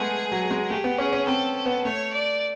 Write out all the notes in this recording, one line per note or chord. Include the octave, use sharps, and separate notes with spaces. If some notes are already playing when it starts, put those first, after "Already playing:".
Already playing: G#3 A3 B3 G#4
F#3
G#3
A3 G4
B3
C#4 G#4
C#4
C4 A4
A4
B3
A3 C#5
D5